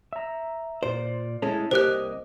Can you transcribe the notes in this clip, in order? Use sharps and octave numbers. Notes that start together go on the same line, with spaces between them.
E5 A#5
A#2 F4 C5 D5
G#3 A3 C#4 E4 D#5 A5
C2 A#3 G4 C5 D#5 F#6